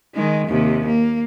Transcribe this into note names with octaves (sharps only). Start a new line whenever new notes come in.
D#3 G#3
D#2 C3
A#3